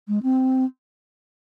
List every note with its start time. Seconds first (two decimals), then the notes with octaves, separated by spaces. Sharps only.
0.08 G#3
0.23 C4